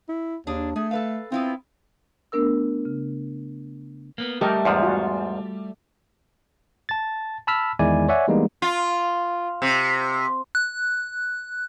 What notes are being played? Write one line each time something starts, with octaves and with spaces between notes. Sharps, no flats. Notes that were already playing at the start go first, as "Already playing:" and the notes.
E4
D#2 D4 G#4
A3 G#4
A4 B4 F5
B3 C4 E4 F4
A3 B3 D4 A#4 E6
C#3
A#3 B3
G3 A3 G4 A#4 D#5
E2 G#2 F3
F4 F#4
A5 A6
A5 B5 E6 F6 B6
E2 D#3 G#3 E4 D5 G#5
C#5 D5 E5 F#5 G#5
E3 G3 G#3 A#3 B3 D#4
F4
C3
F#6